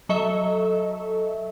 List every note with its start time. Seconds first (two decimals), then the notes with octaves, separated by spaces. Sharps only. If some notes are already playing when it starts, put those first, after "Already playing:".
0.09 F#3 A4 D#5 E5